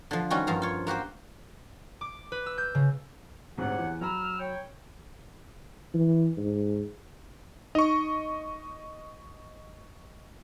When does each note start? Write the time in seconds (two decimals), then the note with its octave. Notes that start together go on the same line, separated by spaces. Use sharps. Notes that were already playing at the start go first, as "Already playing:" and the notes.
0.11 D3 F3
0.30 D#3 G3 C#4 F#4
0.47 G2 F3 A#5
0.62 F4 C#5
0.87 A#3 F#4 G4 C5
2.01 D6
2.32 B4
2.46 E6
2.58 G6
2.75 C#3
3.58 D2 G#2 C3 G4 C#5 F#5
3.78 E2
4.01 F#3 A#5 B5 E6 F6
4.39 C#5 G5
5.94 E3
6.37 G#2
7.75 D#4 D#5 C#6